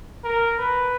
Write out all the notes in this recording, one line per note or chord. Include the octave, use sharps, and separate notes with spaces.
A#4
B4